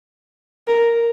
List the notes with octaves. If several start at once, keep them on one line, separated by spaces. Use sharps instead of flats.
A#4